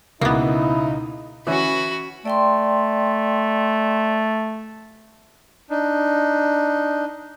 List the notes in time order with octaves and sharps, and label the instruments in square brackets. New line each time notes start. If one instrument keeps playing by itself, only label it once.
[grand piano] C#2 B2 [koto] A#3 B3 [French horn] D#4 [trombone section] E4
[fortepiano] E3 C#4 [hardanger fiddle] F#4 B5
[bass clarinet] A3 [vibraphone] D5 G5 C6
[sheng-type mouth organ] D4 D#4